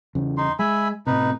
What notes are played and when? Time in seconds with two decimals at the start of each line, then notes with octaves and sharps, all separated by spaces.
0.15 E2 C#3
0.37 D#4 C6
0.59 G#3 E5 G#5 B5
1.07 A2 C3 D#4 B4